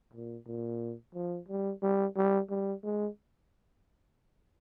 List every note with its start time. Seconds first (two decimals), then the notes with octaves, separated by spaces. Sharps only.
0.14 A#2
0.47 A#2
1.15 F3
1.48 G3
1.82 G3
2.16 G3
2.50 G3
2.84 G#3